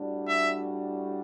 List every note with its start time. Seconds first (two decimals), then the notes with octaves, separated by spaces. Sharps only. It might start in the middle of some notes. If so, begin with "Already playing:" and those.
Already playing: A2 G3 D4 F#4
0.28 E5